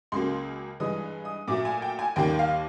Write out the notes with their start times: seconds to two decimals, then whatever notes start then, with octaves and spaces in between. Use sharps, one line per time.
0.12 C#2 C#3 F#3 A#3 C6
0.80 G2 E3 G#3 D#6
1.25 D#6
1.48 A#2 F#3 A3 D6
1.65 G#5
1.82 G5
1.99 G#5
2.16 D#2 D#3 G3 A#3 G5
2.39 F5